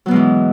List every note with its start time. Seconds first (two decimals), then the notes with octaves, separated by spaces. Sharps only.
0.06 F#3
0.08 B3
0.11 B2
0.13 G#3
0.16 E3